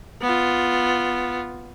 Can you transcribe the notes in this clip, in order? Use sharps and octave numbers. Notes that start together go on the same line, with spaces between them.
B3 F4